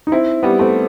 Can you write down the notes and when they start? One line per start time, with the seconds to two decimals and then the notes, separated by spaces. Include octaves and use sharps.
0.07 D#4
0.12 C4 E4
0.43 G3 B3
0.59 A3 C4